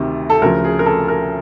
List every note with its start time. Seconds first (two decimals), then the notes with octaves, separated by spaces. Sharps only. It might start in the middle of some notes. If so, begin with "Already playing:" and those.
Already playing: D2 C3 D#3
0.30 A4
0.42 D2 C#3 F3 A#4
0.64 G#4
0.79 A#4
0.86 A4
1.08 A#4